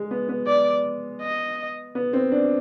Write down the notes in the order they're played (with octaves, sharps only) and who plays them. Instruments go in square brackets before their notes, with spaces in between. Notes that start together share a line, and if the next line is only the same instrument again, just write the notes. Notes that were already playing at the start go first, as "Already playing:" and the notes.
Already playing: [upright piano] G#3
B3
B3
[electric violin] D5
D#5
[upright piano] B3
C4
D4